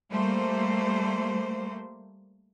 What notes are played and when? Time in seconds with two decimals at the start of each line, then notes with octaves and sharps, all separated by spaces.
0.10 G3 A3 A#3 C5